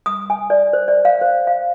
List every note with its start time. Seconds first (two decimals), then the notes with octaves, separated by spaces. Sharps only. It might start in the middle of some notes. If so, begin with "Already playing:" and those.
0.06 D#6
0.30 G#5
0.50 D5
0.73 C5
0.88 D5
1.05 F5
1.21 C5
1.47 F5